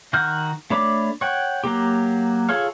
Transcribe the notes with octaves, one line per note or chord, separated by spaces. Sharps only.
D#3 F#4 F#5 F6 G6
A3 D4 C#5 B5 D6
C#5 F#5 G5
F#3 A#3 G4
F4 G#4 A4 C#5 F5